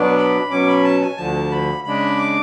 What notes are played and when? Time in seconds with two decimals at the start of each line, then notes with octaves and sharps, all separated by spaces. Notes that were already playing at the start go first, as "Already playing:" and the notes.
Already playing: B2 F#3 B3 D4
0.17 B5
0.51 B2 F#3 C#4 D6
0.68 B5
0.84 A5
1.01 G#5
1.17 D2 D3 F3 A5
1.51 B5
1.84 C#3 G#3 D4 B5
2.18 D6